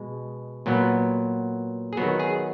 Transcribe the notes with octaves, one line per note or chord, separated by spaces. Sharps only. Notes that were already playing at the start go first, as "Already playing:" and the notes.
Already playing: B2 G#3
A#2 F#3 B3
G#4
D#3 F#3 B3 F#4
G#4